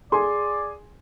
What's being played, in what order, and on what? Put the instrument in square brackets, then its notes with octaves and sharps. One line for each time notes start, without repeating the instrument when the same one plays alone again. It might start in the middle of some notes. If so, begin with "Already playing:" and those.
[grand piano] G#4 G#5 [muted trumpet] D5 [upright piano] C6